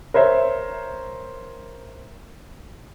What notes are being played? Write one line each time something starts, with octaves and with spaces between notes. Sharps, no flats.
A#4 C5 C#5 E5